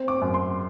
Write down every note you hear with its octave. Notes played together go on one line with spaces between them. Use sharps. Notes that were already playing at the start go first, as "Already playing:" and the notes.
Already playing: C4
D6
F#2
C6